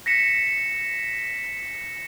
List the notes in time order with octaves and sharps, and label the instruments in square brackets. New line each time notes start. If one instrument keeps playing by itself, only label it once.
[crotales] A#6 B6 C#7 E7